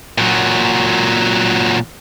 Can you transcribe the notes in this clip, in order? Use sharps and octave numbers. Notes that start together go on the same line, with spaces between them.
A#2 F#3